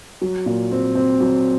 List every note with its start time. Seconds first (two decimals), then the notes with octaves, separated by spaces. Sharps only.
0.22 F#3
0.46 A#2
0.72 C4
0.95 C4
1.20 F#3